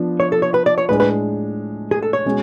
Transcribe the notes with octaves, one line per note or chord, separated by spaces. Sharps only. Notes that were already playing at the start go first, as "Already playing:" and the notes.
Already playing: F3 B3 D4
C#5
A4
C#5
B4
D5
C#5
A2 G#3 D4 B4
B4
G#4
A4
C#5
B2 G#3 C#4